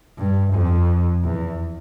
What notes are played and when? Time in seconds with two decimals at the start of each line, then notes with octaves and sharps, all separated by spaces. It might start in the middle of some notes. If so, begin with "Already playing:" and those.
0.18 G2
0.53 F2
1.24 E2